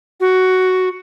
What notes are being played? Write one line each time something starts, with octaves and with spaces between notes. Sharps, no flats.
F#4